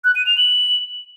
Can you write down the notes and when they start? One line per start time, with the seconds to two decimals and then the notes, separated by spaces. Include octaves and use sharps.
0.04 F#6
0.15 D#7
0.26 F7
0.37 F#7